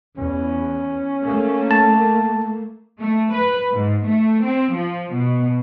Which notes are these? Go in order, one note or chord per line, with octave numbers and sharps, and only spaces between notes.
E2 C#4
A3 A#3
A5
A3
B4
G#2
A3
C4
F3
B2